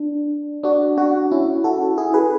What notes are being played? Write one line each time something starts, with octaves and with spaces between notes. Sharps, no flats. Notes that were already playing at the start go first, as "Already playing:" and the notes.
Already playing: D4
D4 F#4
D4 F#4
C#4 E4
F#4 A4
E4 G#4
G#4 B4